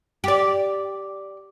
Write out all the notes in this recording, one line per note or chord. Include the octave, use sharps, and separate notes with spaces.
G4 D5